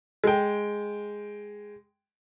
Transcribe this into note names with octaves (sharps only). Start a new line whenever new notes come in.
G#3 G5